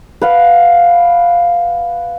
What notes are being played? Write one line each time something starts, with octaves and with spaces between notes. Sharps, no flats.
B4 F5 F#5